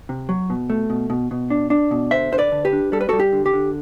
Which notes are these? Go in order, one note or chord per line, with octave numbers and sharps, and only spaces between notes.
C3
F#3
B2
A3
B2
B2
B2
D4
D4
B2
D3 C5 E5
D3 C5
B4 D5
D3
G4 B4
D4
G3 A4
B4
G3 F#4 A4
G4
D3
G4
D3